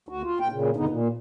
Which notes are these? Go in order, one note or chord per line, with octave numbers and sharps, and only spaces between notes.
D2 F#4
F4
A#2 G5
A#2 C#3
G2 B2 D3 B3 D#4
A#2